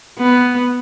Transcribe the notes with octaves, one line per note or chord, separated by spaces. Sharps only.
B3